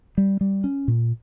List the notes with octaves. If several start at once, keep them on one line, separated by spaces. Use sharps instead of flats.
G3
G3
C#4
A#2